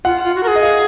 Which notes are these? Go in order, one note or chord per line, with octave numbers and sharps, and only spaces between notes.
F4 F#5
F4
F#4
A#4
G#4
D#5
F5